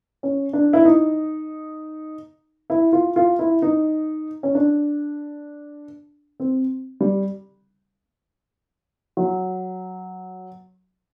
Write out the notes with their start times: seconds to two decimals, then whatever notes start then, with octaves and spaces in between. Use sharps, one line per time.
0.23 C#4
0.53 D4
0.73 E4
0.85 D#4
2.70 E4
2.93 F4
3.16 F4
3.39 E4
3.62 D#4
4.43 C#4
4.55 D4
6.40 C4
7.00 G3
9.17 F#3